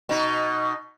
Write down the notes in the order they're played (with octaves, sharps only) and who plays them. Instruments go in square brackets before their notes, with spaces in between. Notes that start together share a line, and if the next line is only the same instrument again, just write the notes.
[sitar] B2 D#4